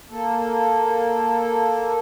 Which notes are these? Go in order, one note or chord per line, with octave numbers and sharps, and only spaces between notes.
A#3 A4